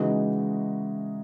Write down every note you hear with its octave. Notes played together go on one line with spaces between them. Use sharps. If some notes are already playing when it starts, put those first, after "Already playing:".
Already playing: C#3 E3 G#3 D#4 F#4